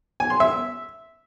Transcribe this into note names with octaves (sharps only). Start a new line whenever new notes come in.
G#5
C6
E5